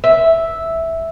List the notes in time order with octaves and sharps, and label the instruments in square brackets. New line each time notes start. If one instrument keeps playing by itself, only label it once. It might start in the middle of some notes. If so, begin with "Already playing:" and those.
[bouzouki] E5